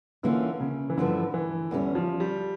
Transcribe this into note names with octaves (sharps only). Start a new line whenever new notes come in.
D3 E3 A#3 C#4 F4
C#3
E3
G2 D3 F3 A3 E4
E3
E2 D3 G3 C#4
F3
G3